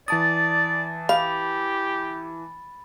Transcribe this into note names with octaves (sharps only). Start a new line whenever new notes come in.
E3 D5 A5 D#6 A6
G4 F5 B5